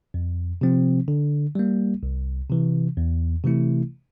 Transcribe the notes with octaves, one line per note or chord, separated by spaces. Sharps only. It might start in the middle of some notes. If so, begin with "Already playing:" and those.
F2
C3 F3 C4
D3
G3 A#3
C2
C3 E3
E2
C3 E3 A3 E4